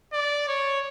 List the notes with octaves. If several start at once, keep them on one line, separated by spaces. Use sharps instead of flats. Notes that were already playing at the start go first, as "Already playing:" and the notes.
D5
C#5